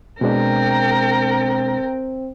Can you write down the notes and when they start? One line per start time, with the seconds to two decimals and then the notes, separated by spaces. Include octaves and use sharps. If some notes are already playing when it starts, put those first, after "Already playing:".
0.21 B2 G#3 C4 D4 A#4 G5